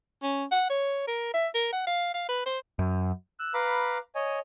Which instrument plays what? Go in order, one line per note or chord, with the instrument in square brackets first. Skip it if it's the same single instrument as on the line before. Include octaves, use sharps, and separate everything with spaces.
[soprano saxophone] C#4
F#5
C#5
A#4
E5
A#4
F#5
F5
F5
B4
C5
[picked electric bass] F#2
[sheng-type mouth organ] E6 F#6
B4 F5 A#5 B5 D6
C#5 D#5 G#5